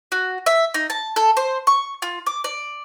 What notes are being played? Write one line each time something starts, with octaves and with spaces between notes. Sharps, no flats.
F#4
E5
D#4
A5
A4
C5
C#6
F4
D6
D5